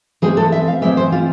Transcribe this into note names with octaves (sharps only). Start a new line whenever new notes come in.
E3 G#3 C4 G#4
A4
E5
F5
E3 G#3 C4 E5
C5
F4